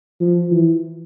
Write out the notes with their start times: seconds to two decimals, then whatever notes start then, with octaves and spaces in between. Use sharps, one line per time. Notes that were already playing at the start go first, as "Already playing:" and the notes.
0.20 F3
0.51 E3